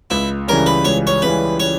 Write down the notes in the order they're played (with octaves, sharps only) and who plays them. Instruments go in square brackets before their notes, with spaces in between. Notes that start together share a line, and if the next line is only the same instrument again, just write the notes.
[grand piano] C#2 [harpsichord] E4
[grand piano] C#3 E3 G3 C#4 [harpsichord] A#4
[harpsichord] B4
[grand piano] C#2 [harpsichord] C#5
[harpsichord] C#5
[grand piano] C#3 E3 G3 C#4 [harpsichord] B4
[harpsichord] C#5